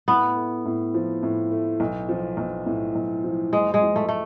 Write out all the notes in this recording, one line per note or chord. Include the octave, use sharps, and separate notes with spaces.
A2 B3
A3
A2
F3
A2
A3
B1
F3
B1
A2
B1
F3
F#1 G#3
G#3
F3
A3
A3